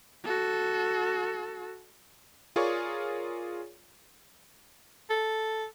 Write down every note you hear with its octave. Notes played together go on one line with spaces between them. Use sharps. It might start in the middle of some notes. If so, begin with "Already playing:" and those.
F#4 A4
F4 G#4 A#4 C#5 D5 C#6
A4